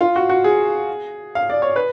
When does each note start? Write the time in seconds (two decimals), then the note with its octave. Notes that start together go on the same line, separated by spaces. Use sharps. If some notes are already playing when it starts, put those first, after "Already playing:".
0.01 F4
0.16 F#4
0.29 F#4
0.44 G#4
1.35 F5
1.50 D5
1.62 C#5
1.76 B4